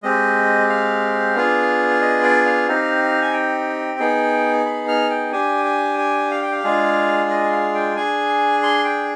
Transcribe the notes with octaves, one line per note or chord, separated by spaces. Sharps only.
G#3 C4 G4 D#5
F5
B3 D4 F4 G#4
F5
D#5
D5
F5
C4 D#4 G4 F5
G#5
G5
B3 D#4 G#4
B5
F6
G5
D4 G4 G#5
G#5
G#5
F5
G5
F5
G#3 D4 F4 G#4
D#5
F5
G5
D4 G#4 G#5
C6
G5